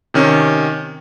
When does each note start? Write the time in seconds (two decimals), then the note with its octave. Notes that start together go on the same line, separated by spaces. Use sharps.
0.14 C3 D#3 C#4